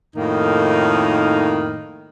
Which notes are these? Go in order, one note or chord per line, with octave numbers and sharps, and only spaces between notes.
F2 A2 D#3 A#3 D#4